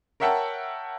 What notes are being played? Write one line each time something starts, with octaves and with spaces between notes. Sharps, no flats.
A#4 C#5 E5 F#5 G5 A5